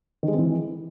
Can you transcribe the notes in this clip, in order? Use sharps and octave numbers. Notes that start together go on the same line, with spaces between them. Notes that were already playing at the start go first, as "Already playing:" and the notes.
D#3
G#3
C4
E3